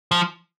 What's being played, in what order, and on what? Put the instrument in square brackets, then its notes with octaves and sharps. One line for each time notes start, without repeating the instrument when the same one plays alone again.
[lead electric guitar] F3